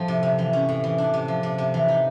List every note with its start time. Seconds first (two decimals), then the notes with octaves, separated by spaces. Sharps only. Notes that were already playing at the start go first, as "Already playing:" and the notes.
Already playing: A2 F3 C4
0.08 C3
0.23 C3
0.39 E3
0.53 C#4
0.69 A2
0.84 E3
0.98 D4
1.14 C3
1.28 F3
1.43 C3
1.58 C3
1.74 E3
1.88 D#4